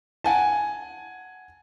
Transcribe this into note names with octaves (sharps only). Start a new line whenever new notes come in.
F#5 G#5 A5